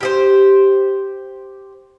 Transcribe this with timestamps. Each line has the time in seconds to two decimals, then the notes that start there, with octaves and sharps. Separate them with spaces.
0.01 G4 G#4 C5